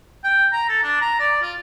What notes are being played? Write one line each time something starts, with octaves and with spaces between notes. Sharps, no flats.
G5
A#5
A4
D4
A#5
D5
F4